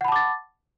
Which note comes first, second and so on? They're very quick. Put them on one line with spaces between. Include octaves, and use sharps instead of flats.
F#5 B5 A5 D6 A6